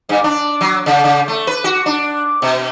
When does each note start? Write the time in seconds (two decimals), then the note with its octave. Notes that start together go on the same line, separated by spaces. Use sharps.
0.09 G2
0.24 D4
0.61 F#3
0.86 C#3
1.04 C#3
1.28 A3
1.47 B4
1.64 F#4
1.86 D4
2.42 B2